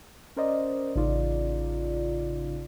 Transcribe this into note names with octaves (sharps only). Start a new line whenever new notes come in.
C#4 A#4 C5 D5 D#5
A1 C#3 D#4 F4 D5